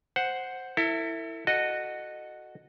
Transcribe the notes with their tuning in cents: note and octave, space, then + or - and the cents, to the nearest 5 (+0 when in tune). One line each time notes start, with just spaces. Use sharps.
C5 +0 F#5 +0
E4 +0 A4 +40
F#4 +0 A4 +0 D#5 -20